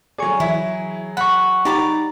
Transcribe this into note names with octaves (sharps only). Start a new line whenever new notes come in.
F#3 G#4 D5 G#5 C#6
E3 E4
F#5 B5 C#6
D#4 G4 D5 A#5 B5 D6